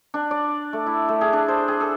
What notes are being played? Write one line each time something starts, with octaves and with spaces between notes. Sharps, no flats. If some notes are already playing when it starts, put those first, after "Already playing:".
D4
D5
A3
E4
A3
G#4
D4
C5
G#4
A4